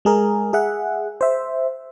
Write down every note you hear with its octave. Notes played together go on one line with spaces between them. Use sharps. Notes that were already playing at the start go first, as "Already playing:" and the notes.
G#3 G#4 A#4
G#4 E5 F#5
C5 E5